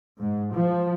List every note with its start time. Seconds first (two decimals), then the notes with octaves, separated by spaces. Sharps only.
0.19 G#2
0.53 F3